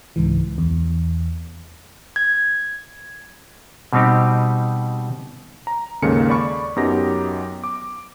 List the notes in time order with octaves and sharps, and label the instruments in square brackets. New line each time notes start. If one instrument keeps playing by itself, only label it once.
[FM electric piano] C#2 G#2 E3
E2
[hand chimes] G#6
[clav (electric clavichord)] B2 G3 C4 D#4 G4
[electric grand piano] A#5
D#2 G#2 C#3 A#3 A4 C#7
D5 B5 C#6
F#2 B3 D#4 G4 A#6
D6